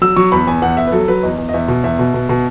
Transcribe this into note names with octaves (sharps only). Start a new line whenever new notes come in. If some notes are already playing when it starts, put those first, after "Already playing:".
F#3 E6
F#3 C#6
E2 B5
E2 G#5
E2 F#5
E2 E5
B4
F#3 A4
F#3 B4
E2 D#5
E2
D#5
E2 E5
B2
E2 E5
B2
B2
B2